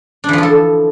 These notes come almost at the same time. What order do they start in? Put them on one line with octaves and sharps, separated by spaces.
D4 E3 F3 F4 A4